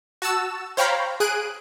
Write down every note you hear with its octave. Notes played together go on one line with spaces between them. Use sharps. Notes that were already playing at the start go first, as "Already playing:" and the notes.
F#4 A5 E6 E7
C5 C#5 F5 G5 A#5 B5
G#4 F#6 D7 D#7